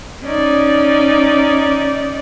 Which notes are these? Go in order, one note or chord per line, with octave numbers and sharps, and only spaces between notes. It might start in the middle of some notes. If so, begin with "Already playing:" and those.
C#4 D#4 D5